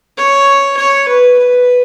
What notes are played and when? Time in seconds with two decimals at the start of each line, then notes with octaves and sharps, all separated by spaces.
0.17 C#5
0.77 C#5
1.08 B4
1.38 B4